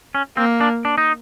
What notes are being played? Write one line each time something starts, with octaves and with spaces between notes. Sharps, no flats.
C#4
A#3 C4
D4
D4
D#4